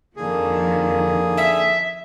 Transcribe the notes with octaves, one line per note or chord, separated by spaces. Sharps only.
F2 D3 D#3 F3 A#3 G#4
E5